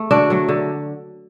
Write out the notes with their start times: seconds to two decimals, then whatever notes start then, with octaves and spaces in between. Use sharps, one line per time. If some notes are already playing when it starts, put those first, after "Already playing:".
Already playing: A3
0.11 D3 D4 F#4
0.30 F#3 A3
0.49 D3